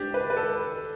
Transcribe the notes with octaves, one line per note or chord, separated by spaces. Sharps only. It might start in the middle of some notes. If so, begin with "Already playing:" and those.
Already playing: D4 G4
B4
B4
A4